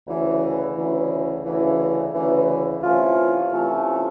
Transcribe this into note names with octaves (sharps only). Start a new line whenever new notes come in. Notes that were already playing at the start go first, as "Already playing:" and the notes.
D2 C#3 E3
D2 C#3 E3
D2 C#3 E3
D2 C#3 E3
C3 E3 A3 C#4 F4
C3 E3 A3 C#4 F4